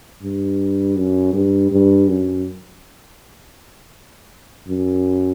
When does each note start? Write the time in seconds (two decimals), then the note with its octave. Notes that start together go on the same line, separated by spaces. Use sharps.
0.23 G2
0.97 F#2
1.34 G2
1.71 G2
2.08 F#2
4.68 F#2